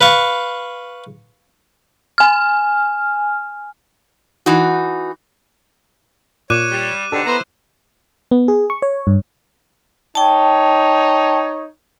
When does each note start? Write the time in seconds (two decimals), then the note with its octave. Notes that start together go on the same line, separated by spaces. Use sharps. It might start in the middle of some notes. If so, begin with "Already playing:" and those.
0.01 B4 F5 C#6
2.18 G#5 F6
4.46 E3 D#4 F#4
6.50 A#2 C#5 D6 F#6 D#7
6.71 G3
7.12 G#2 B2 D3 D4 G4 A4
7.26 B3 E4 C5 A#5
8.31 B3
8.48 G#4
8.70 C#6
8.82 C#5
9.07 G2
10.15 D#4 C#5 G5 A5